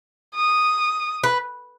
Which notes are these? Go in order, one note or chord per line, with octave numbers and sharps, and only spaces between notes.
D#6
B4